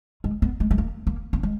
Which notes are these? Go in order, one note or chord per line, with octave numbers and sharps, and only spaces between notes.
G#3
B3
G#3
G#3
A#3
A#3
B3
G#3